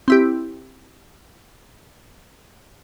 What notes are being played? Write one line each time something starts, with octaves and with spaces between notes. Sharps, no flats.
C4 E4 G4